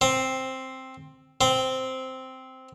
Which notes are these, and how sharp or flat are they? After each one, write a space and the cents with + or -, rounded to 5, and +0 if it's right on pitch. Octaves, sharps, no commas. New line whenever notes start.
C4 +5
C4 -5